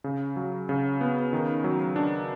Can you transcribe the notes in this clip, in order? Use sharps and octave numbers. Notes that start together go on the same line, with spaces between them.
C#3
F#3
C#3
B3
D#3
F#3
D4